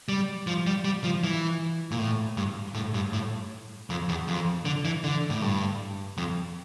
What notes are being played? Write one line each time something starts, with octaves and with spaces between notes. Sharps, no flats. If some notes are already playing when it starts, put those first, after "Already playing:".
G3
F3
G3
G3
F3
E3
A#2
A2
G2
A2
G2
A2
F2
E2
F2
D3
E3
D3
A2
G2
F2